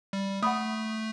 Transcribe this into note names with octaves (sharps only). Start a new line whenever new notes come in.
G3
A3 F#5 B5 D#6